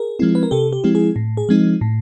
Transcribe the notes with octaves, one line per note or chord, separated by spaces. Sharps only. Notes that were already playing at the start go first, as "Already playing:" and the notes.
Already playing: G#4 A#4
F3 G#3 C4 E4
B4
A#4
C3 G4 A4
G4
F3 G#3 C4 E4
G#4
A2
G#4
F3 G#3 C4 D#4
A2